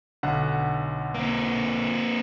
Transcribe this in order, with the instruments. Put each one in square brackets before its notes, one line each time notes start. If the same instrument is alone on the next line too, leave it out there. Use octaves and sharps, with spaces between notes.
[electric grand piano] B1 D3 F#5
[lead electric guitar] A#3 C4